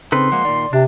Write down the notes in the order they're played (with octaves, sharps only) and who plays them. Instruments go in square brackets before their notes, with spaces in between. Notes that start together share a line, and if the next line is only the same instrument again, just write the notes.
[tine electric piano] C#3 C4 [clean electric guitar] D#4 A4 B4 [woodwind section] C6
[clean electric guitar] F3 G#3 A#3 [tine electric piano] F#5
[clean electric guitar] A#2 D#3 [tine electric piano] D5
[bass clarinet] C3 [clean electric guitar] D4